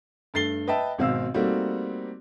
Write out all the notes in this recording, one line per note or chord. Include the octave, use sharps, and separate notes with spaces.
G2 A3 A6 C7 G7
B4 D#5 E5 G5 A5
G#1 B2 C4 F5 E6
G3 A3 A#3 C4 D#4 F#4